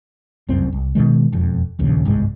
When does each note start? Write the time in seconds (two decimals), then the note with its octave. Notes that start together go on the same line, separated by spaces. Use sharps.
0.49 F1 C2 F#2 C4
0.72 C2
0.95 B2 D3 D#3 G#3
1.33 E1 F2
1.79 D1 A#1 D#2 C#3
2.05 G1 C2 G#2 G#3